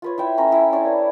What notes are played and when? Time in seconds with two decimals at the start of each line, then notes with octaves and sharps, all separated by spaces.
0.02 F4 B4 C#5
0.18 E4 E5 G5
0.37 A3 C#4 A#5 B5
0.52 E4
0.72 D4 C#5 D5 C6
0.85 B4